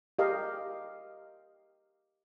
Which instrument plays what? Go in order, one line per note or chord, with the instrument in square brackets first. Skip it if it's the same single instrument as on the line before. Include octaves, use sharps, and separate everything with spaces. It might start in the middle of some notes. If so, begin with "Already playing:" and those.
[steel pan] G4 A#4 D#5 F5